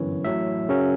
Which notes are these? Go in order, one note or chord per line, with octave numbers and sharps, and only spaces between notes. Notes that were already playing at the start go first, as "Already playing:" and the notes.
Already playing: G1 F#2 E3 C#5
A1 A2 F#3 E5
F#2 C#3 F#3 C#4